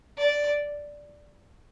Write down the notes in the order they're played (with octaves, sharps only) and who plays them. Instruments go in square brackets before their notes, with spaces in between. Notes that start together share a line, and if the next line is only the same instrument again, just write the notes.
[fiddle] D5